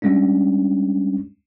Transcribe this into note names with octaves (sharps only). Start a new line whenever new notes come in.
G3 G#3 C#4 D4